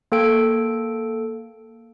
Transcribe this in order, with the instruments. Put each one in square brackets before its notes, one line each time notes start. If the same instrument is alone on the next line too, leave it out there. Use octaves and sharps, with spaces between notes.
[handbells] A#3 A4 G5 D7